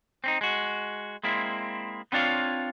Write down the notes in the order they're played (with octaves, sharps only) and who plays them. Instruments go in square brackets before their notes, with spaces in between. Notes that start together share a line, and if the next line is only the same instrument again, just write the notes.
[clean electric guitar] C4 C#4 D#4
G#3 F#4
G#3 A#3 C4 E4
B3 C4 D4 F4 C#5 F5